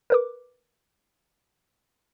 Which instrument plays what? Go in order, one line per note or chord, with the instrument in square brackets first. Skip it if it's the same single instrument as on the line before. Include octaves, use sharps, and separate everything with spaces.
[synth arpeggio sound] A#4 B4 D6